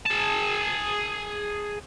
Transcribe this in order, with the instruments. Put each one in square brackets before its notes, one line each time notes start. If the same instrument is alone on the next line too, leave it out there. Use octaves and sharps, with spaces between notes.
[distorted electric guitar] G#4 A5